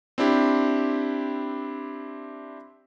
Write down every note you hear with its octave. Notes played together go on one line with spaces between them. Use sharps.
C4 D4 E4 G4